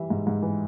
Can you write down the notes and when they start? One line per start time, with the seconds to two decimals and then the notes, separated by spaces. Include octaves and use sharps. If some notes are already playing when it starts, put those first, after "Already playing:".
Already playing: E3 G3 E5
0.10 G#2
0.27 G#2
0.43 E3